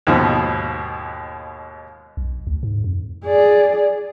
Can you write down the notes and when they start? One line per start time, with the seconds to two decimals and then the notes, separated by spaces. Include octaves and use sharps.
0.07 D#2 G#2 B2 F3
2.17 B1
2.47 D2
2.63 G#2
2.84 F2
3.25 G#4 D5